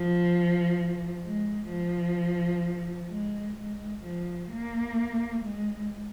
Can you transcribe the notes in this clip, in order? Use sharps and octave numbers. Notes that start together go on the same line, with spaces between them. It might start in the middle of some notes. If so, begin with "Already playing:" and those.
Already playing: F3
G#3
F3
G#3
G#3
F3
A#3
G#3